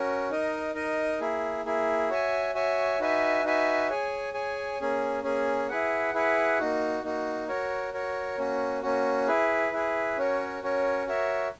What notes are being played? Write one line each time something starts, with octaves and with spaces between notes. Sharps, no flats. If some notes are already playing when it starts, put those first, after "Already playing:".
Already playing: C#4 F#4 A#4
D#4 A#4 D#5
D#4 A#4 D#5
A#3 E4 G#4
A#3 E4 G#4
F#4 C#5 E5 G#5
F#4 C#5 E5 G#5
D#4 F#4 B4 E5 G#5
D#4 F#4 B4 E5 G#5
G#4 C#5 G#5
G#4 C#5 G#5
A#3 C#4 G#4
A#3 C#4 G#4
E4 G#4 B4 F#5
E4 G#4 B4 F#5
A#3 D#4 F#4
A#3 D#4 F#4
F#4 A#4 C#5
F#4 A#4 C#5
A#3 C#4 F#4
A#3 C#4 F#4
E4 G#4 B4
E4 G#4 B4
C#4 F#4 A#4 C#5
C#4 F#4 A#4 C#5
F#4 A#4 C#5 E5